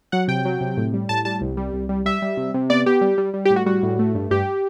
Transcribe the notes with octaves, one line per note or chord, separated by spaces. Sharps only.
F#3 F#5
C3 G5
F#3
C3
A2
G3
A2 A5
G3 A5
C2
G3
C2
G3
G3 E5
G3
C3
C3
B3 D5
B3 G4
G3
G3
G3
G4
A2
F#4
G3 F#4
A2
A3
G2
G2 G4